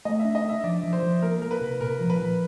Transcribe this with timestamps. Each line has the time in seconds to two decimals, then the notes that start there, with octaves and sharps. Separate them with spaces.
0.05 A3 D#5
0.19 E5
0.25 D4
0.35 D#5
0.45 D4 E5
0.64 F3 D5
0.83 F3
0.93 C5
1.02 F3
1.22 A#3 A#4
1.42 A#3 A#4
1.51 B4
1.61 C3
1.81 A#2 A#4
2.00 F3
2.10 B4
2.20 F3